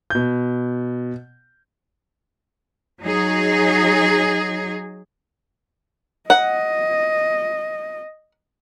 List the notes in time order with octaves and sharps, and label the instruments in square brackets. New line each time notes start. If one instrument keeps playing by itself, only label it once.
[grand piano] B2 G6
[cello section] F#3 D#4 G#4
[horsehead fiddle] D#5 [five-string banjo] F#5